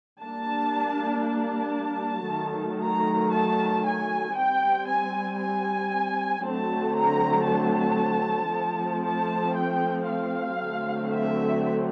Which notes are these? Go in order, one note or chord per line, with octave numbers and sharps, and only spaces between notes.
G3 A#3 D4 A5
A5
D#3 F#3 A3
A#5
A5
G#5
G3 C4 G5
G#5
G#5
D3 F#3 A3 C4 A5
A#5
A5
F3 A3 C4
A5
G5
F5
D3 F#3 A3 C4
E5